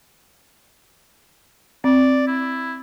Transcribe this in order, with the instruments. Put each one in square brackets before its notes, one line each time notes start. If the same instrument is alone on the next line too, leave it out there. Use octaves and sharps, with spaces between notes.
[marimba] C4 [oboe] D5
[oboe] E4